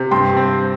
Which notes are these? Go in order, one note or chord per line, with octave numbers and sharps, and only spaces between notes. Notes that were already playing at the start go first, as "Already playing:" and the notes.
Already playing: C3
G2 G5 C6
C4